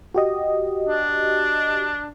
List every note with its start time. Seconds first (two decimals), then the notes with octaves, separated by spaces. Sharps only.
0.15 F#4 G4 D#5
0.88 D4